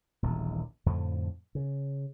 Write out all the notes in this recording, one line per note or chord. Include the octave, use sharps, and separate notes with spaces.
D#1 A#1 B2 E3
F2 A2 D3 F3
C#3